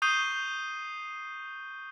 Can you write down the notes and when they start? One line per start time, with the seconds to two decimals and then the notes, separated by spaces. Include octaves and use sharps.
0.02 C#6 D#6 G6 C7 D#7 G7